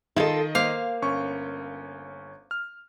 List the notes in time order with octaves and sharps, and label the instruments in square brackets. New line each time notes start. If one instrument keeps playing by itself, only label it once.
[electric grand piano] D#3 D#5 [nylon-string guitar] E4 F4 A4
[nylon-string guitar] A#3 [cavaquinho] C5 F5 D6
[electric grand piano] G1 C#4 C#6
F6